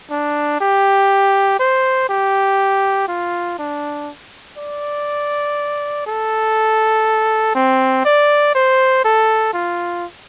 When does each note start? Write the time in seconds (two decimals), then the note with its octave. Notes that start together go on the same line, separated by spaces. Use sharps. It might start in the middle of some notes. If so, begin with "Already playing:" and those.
0.10 D4
0.61 G4
1.60 C5
2.09 G4
3.08 F4
3.59 D4
4.57 D5
6.07 A4
7.55 C4
8.05 D5
8.55 C5
9.05 A4
9.54 F4